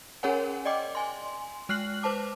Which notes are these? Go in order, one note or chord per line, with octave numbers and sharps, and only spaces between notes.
C#4 G#4 A#4 C#5 F#5 G#5
D5 D#5 G5 D6
G#5 C6
G#3 F6 F#6 C7 F#7
B4 C5 A5 D6